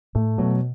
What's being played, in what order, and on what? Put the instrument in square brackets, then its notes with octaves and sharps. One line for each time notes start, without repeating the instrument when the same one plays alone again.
[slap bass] A2 [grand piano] A3
[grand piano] B2 [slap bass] F#3